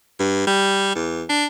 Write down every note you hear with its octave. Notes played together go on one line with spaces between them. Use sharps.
G2
G3
E2
D4